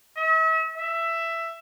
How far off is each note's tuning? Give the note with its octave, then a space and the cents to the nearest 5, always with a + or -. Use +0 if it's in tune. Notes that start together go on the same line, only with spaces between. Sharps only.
E5 -45
E5 +10